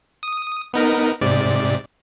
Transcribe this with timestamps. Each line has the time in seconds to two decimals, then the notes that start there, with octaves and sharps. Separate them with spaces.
0.23 D#6
0.74 B3 D#4 A#4
1.21 G#2 C3 D5